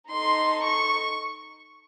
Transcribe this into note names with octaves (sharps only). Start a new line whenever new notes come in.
D#4 A4 C6
C#6